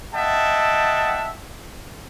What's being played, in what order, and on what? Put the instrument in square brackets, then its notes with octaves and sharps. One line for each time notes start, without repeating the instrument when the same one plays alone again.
[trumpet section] D#5 E5 F#5 G5 A5